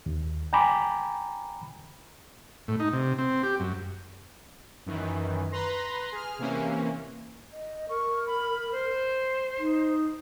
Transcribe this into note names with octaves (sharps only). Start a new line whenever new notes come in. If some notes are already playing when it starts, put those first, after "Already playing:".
D#2
G5 G#5 A#5 B5 D6
A2
D#4
C3
C4
G4
F#2
F#2 D#3 E3
B4 A#5 C6 A#6
G#4 F6
C3 E3 A#3 C#4
D#5
A#4 C#6
B5
C5
D#4